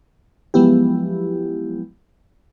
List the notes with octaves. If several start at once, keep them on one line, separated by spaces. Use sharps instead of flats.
F3 F#3 G#3 B3 E4 G4